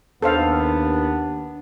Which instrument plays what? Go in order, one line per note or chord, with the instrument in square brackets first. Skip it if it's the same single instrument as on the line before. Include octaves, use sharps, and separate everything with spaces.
[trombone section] D#2 [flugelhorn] B3 [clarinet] D4 [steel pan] A4 C5 F5